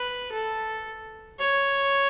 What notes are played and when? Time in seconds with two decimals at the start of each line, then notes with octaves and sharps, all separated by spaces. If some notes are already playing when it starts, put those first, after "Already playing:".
Already playing: B4
0.32 A4
1.39 C#5